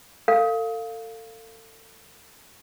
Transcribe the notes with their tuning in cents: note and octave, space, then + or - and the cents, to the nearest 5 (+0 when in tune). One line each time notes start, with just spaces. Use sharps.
A4 +35 F5 +0